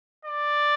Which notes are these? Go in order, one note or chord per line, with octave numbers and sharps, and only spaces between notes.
D5